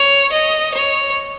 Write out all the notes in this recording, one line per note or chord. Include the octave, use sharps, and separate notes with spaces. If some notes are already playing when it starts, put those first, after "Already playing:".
Already playing: C#5
D#5
C#5